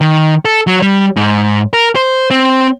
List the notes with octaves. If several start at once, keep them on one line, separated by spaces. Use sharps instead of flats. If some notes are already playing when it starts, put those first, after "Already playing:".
D#3
A4
F#3
G3
G#2
A#4
C5
C4